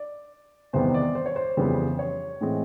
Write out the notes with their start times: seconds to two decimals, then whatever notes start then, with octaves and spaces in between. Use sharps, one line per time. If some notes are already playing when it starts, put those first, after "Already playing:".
Already playing: D5
0.73 E2 C3 D#3 G3 B3 C5
0.94 D5
1.15 C5
1.26 C#5
1.36 C5
1.57 F2 C#3 E3 G3 B3
1.99 C#5
2.41 A2 E3 G#3 C4